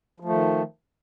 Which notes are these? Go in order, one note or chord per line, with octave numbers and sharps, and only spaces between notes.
D#3 F3 A3